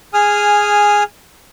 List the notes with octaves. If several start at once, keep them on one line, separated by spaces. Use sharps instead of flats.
G#4 G#5 D#6 F6